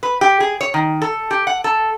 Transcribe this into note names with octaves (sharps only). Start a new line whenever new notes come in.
B4
G4
G#4
C#5
D#3
A4
G4
F#5
A4